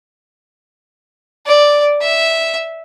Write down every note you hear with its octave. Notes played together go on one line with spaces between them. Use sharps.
D5
E5